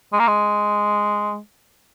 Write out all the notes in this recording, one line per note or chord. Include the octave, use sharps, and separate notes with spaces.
G#3
A#3
G#3